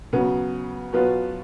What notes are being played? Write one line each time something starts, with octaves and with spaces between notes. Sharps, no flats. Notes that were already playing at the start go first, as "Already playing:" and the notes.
C#3 F#3 B3
B2 F#3 B3 F4 B4